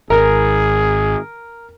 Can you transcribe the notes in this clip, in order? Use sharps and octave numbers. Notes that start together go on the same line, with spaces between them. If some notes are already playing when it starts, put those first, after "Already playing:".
G#1 G#4 A#4